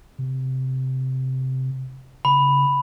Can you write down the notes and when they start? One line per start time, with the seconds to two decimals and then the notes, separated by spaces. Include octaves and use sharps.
0.19 C3
2.25 C#3 B5